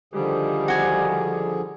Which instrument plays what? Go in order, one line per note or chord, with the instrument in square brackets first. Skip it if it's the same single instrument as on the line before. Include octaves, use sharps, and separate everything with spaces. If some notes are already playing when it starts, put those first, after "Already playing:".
[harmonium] D3 F3 G#4 [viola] D#3 G3
[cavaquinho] F#4 G#5